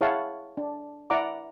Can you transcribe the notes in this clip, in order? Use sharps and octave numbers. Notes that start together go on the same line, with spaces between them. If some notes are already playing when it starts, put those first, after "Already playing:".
E4 G#4 C#5 F5 F#5 A5
D4
E4 D5 F#5 A#5 D6